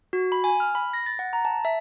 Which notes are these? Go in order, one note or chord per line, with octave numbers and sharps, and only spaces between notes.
F#4
B5
G#5
F6
B5
A#6
A6
F#5
A#5
A5
E5